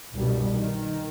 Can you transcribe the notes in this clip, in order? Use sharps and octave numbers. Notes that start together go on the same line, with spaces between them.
C2 G2 B2 G3
D#3